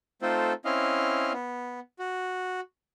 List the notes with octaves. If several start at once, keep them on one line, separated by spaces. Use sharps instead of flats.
A3 C4 D#4 F4 A4 C5
C4 C#4 E4 D#5 F5
B3
F#4